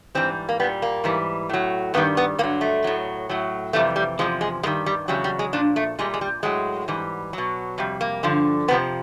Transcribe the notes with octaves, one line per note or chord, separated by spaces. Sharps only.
G#2 E3 G3 C4
A#3
A#2 G3 B3
A#3
G#2 E3 G3
A2 F#3
G2 D#3 G3 B3
B3
G2 D3 F#3 A#3
A3
A2 F#3
A2 F#3
F2 C3 E3 G3 A3
G3
E2 C3 F3 G#3
G#3
G2 D#3 G3 G#3
G3
E2 C#3 F#3 G3
G3
G#3
A#2 F3 D4
A3
A#2 G3 G#3
G#3
G3
A2 F#3 G#3
G#2 E3 G3
B2 F#3
F2 C3 G3
A#3
G2 D3 F3
F2 C3 F3 B3